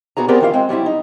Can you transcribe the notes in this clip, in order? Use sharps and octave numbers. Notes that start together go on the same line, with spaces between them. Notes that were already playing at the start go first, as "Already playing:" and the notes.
A#2 B3 F#4 G#4 A#5
B3 C4 G4 G#4 A#4 D5
D#3 E3 F4 F5
G#3 C4
F#3 G3 C4 E4
D#4